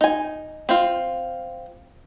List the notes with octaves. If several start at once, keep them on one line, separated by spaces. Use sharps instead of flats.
D#4 G#5
C4 F4